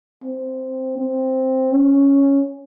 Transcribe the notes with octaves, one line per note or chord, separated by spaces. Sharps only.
C4
C4
C#4